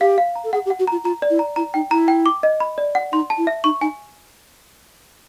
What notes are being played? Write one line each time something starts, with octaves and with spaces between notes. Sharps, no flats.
G4 F5
F5
A#5
A4
G#4 F#5
G4
F#5
F#4
F4 A#5
F4 A#5
D5
E4
A#5
E4 A#5
D#4 G5
E4 A#5
G5
D6
D#5
B5
D5
F#5
D#4 C6
A5
E4
E5
D#4 C#6
D#4 G#5